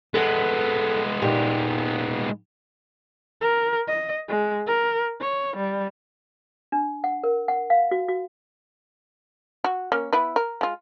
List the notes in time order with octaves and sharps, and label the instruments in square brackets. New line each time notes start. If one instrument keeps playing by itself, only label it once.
[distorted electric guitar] G#3 B3 [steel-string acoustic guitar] A4 B4 F#5
[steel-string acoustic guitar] A#2 D#4 G4
[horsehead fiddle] A#4
D#5
G#3
A#4
C#5
G3
[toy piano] D4
F#5
A#4
F#5
F5
F#4
F#4
[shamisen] F#4
A#3 C#4
B3 E4 B4
A#4
G#3 F4